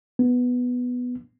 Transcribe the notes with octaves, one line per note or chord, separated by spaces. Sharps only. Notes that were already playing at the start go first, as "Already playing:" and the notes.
B3